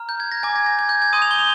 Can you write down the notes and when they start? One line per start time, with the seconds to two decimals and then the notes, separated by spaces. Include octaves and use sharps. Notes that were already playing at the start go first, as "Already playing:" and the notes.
Already playing: A#5 F6
0.09 G6
0.20 G#6
0.32 A#6
0.43 G#5 D6 G6 G#6
0.56 A#6
0.66 A#6
0.79 G#6
0.89 G6
1.02 G#6
1.13 C6 D#6 G6 D#7
1.22 F7
1.31 G7
1.39 F7